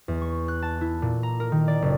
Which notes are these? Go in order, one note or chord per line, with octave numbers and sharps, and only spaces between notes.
E2
C#6
F#6
A5
E4
A#2
A#5
A#4
D#3
D5
F#1